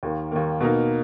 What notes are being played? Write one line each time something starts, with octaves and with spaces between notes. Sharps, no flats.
D#2 D#3 A#3
D#2 D#3 A#3
B2 A#3 D#4 A#4